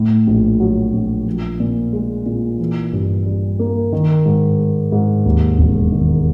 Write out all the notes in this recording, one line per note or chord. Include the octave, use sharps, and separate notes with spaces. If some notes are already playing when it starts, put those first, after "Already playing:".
Already playing: A2
A#1
F#3
A#1
F3
A#2
G#3
A#2
E3
G2
G3
A#3
D#3
G#2
G#3
G#2
D#2
E1
D#3